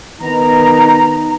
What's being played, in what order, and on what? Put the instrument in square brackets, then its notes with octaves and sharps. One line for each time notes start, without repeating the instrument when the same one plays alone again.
[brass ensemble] D#3 B3 D#4 [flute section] A#5